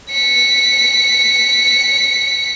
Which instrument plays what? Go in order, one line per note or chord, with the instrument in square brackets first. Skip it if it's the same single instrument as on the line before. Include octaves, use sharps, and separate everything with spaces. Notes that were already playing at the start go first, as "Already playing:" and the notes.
[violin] B6 C#7